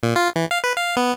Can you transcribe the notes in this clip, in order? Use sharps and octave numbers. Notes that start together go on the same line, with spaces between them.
A#2
F4
E3
F5
B4
F5
B3